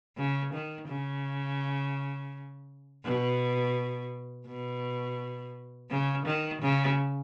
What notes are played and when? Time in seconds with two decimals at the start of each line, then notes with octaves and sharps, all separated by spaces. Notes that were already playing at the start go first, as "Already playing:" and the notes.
0.17 C#3
0.53 D#3
0.88 C#3
3.04 B2
4.47 B2
5.90 C#3
6.26 D#3
6.62 C#3